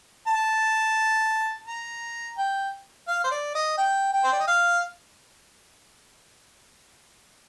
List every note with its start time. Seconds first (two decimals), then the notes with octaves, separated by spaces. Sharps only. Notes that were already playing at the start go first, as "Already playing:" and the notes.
0.28 A5
1.67 A#5
2.38 G5
3.08 F5
3.24 C5
3.31 D5
3.55 D#5
3.78 G5
4.13 G5
4.24 C5
4.32 D5
4.40 D#5
4.48 F5